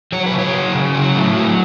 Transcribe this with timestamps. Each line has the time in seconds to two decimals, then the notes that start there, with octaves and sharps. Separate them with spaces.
0.12 F#3 C#5
0.26 B4
0.33 C#3
0.39 C#5
0.54 F#3
0.75 C#3
0.95 F#3
1.15 A2
1.36 F#3